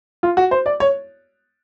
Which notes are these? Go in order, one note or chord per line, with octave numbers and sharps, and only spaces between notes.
F4
F#4
C5
D5
C#5